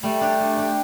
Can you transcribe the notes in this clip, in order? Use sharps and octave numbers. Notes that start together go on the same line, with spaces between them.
G3 A3
D4 G4
G3
D4 G4